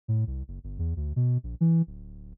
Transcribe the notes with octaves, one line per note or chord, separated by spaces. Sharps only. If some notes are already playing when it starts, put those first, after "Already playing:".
A2
C2
F#1
G1
E2
D2
B2
A#1
E3
D1